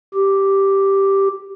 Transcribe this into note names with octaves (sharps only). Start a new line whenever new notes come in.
G4